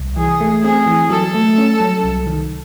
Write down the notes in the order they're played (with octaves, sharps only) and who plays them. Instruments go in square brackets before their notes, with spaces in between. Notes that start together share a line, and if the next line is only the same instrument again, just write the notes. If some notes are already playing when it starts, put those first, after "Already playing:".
Already playing: [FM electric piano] C2
[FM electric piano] E3 [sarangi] G#4
[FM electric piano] A3
[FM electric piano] C4 [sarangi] G#4
[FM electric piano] E3
[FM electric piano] F#3 [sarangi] A4
[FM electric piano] A3
C#4
F#3
C2
D#3